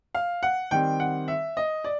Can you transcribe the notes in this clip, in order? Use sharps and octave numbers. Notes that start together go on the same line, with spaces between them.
F5
F#5
D#3 G3 C4 G5
F#5
E5
D#5
D5